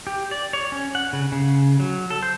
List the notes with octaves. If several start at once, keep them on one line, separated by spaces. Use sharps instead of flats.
G4
D5
C#5
C#4
F#5
C#3
C#3
F#3
A4
C5